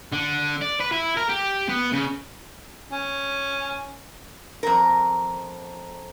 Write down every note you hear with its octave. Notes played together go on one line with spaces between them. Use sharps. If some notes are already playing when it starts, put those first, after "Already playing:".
D3
D5
B4
E4
A#4
G4
B3
C#3
C#4
F2 A#4